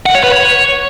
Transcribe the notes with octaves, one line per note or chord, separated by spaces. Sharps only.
F#5
C#5
B4
C#5